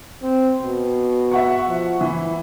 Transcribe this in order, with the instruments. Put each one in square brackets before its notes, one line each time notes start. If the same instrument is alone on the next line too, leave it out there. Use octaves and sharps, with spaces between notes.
[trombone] C4
B2
[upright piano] E5 F#5 C#6
[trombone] F3
[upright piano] E3 [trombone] E4